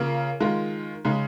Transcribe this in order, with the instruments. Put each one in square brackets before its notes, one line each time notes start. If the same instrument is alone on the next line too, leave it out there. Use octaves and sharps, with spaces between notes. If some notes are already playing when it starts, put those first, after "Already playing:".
Already playing: [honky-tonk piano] C#3 A#3 F4
D#3 G#3 F4
C#3 G#3 D#4